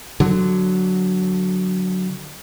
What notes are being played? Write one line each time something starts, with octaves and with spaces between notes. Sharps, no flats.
D3 F#3